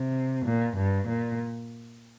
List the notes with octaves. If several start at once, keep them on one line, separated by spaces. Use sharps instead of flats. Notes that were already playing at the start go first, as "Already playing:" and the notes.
Already playing: C3
A#2
G2
A#2